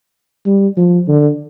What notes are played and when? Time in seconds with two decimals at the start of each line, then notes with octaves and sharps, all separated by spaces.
0.46 G3
0.77 F3
1.08 D3